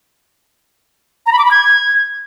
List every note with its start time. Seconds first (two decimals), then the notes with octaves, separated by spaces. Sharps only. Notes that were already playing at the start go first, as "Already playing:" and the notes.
1.26 A#5
1.32 B5
1.39 D6
1.45 B5
1.51 G#6